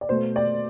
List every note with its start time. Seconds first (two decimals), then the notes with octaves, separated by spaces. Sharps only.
0.01 D5
0.09 B2 A3 C5
0.36 D5